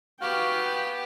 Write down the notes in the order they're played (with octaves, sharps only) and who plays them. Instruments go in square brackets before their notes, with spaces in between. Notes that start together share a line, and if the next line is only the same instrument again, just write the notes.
[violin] B3 G4 [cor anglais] F#4 [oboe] F5 [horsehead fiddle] G5